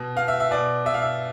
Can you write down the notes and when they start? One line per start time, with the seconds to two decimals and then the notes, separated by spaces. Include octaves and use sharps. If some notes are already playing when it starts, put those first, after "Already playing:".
Already playing: B2
0.16 B2 F5
0.28 E5
0.40 E5
0.51 B2 D5
0.85 B2 E5
0.94 F5
1.02 E5